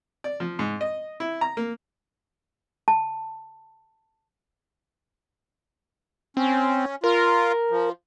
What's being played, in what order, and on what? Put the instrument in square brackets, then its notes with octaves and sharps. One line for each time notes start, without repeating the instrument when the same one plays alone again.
[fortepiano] D5
F3
G#2
D#5
E4
A#5
A#3
[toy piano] A5
[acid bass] C4 [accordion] C#4
[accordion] F4 [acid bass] A#4
[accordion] F3